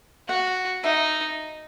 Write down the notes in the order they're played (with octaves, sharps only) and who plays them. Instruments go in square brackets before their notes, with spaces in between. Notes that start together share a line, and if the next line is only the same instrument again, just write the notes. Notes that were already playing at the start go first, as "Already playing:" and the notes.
[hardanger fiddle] F#4 [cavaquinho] F#5
[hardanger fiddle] D#4 [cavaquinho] E5